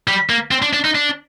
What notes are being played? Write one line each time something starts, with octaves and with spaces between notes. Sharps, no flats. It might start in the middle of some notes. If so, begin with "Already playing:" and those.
G3
A#3
C4
D4
D4
D#4
D4